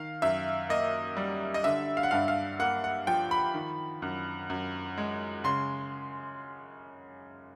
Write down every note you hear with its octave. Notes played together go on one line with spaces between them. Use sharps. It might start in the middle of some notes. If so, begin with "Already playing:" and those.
Already playing: D#3 F5
F#2 E5
A#3 D#5
G3
D#5
D3 E5
F5
F#5
G2 F5
F5
A#3 F#5
F#5
F3 G5
B5
D#3
F#2
F#2
G#3
C#3 C6